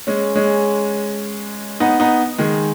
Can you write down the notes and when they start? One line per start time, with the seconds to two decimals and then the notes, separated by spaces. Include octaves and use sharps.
0.07 G#3 C#4
0.36 G#3 C#4
1.80 B3 D#4
2.00 B3 D#4
2.38 D#3 G#3